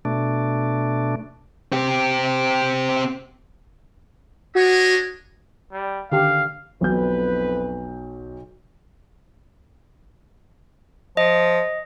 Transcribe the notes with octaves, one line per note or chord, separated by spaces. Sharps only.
B2 A3 D4
C4 G4
D4 F#4 C#5 D#5
G3
D3 D#3 G4 F5
B1 F2 B2 B4 G6
F3 D#5